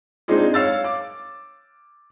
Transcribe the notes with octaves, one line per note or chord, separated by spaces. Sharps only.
G#3 C4 D4 D#4 F4 G#4
C#5 F5 E6 A6
D6